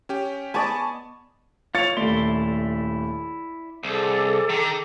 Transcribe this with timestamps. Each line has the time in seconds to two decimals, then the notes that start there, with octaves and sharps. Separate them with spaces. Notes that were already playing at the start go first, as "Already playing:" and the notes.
0.09 C#4 G4
0.54 B3 D5 D#5 G#5 A5 C#6
1.75 F4 C#5 A6 F7
1.97 D#1 A3 E4 D5 C6
3.83 C2 G#4 A4 D6
4.49 D#3